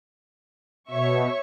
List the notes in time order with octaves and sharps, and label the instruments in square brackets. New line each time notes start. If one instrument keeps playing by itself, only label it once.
[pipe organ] B2 [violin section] C#5 E5 C#6